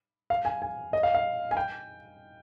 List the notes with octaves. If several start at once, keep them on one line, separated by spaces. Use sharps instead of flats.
F5
G#5
G#5
D#5
F5
F5
G#5
G5